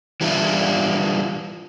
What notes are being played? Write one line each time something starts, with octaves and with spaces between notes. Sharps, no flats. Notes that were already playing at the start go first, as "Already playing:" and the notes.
E3 G3 D4 E4 F4